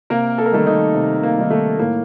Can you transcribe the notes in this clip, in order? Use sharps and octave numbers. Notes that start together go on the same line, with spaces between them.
C3 A#3 A#4
A4
A#4
D#3 G3 A3 A4
D#3 D#4
C3
A#3
D#3 G3
A3
A2 A#3